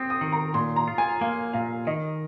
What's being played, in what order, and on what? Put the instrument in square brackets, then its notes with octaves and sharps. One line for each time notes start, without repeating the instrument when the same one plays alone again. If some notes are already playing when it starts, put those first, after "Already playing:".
Already playing: [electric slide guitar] C4 [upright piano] D#6
[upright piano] D#6
[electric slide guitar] D#3
[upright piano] A#5
[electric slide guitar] A#2 [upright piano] C6
[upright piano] A#5
[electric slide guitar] F4
[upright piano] G#5
[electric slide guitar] A#3 [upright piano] F5
[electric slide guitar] A#2 [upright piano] F5
[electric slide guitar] D#3 [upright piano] D#5